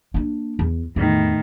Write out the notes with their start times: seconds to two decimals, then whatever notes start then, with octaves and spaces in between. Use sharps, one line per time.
0.14 A#3 D4
0.59 E2
0.96 E2 A2 D#3